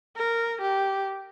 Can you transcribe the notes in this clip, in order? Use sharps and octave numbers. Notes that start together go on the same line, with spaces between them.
A#4
G4